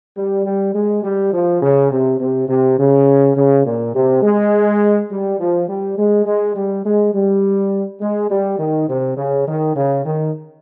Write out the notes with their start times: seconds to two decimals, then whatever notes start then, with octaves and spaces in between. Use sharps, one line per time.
0.16 G3
0.45 G3
0.74 G#3
1.03 G3
1.33 F3
1.61 C#3
1.91 C3
2.19 C3
2.48 C3
2.78 C#3
3.36 C#3
3.65 A#2
3.94 C3
4.22 G#3
5.10 G3
5.39 F3
5.68 G3
5.97 G#3
6.26 G#3
6.55 G3
6.84 G#3
7.13 G3
8.00 G#3
8.30 G3
8.59 D#3
8.88 C3
9.16 C#3
9.46 D#3
9.75 C#3
10.04 D#3